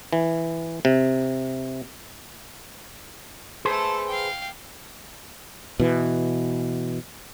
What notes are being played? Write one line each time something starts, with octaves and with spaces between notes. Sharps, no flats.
E3
C3
A3 G#4 A4 B4 C5
F5 G5
B2 E3